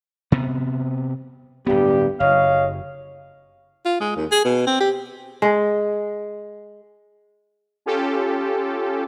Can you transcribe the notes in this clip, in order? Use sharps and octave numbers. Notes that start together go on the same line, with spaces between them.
C3 B3
D1 G2 B3 G4
F#1 C#5 D#5 F5
F4
G#3
D#2
G#4
B2
C4
G4
G#3
C#4 F4 G4 A4